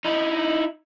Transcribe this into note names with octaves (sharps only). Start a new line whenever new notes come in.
D#4 E4